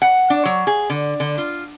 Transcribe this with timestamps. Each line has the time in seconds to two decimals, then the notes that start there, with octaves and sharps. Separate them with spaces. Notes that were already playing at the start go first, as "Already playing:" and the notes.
0.02 F#5
0.30 D4
0.45 F#3
0.67 G#4
0.90 D3
1.20 D3
1.38 F4